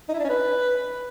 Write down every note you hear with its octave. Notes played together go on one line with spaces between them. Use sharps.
D#4
E4
D4
C#4
B4